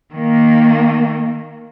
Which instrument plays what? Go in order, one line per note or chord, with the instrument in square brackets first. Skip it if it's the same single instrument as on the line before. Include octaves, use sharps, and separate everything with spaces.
[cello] D#3 A#3